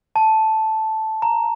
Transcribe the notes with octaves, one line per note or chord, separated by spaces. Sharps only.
A5
A#5